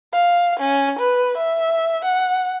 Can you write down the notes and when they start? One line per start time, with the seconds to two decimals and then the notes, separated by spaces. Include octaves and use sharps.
0.13 F5
0.60 C#4
0.99 B4
1.37 E5
2.05 F#5